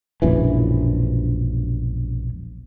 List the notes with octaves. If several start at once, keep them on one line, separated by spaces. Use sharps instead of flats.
E1 A#1 F#2 E3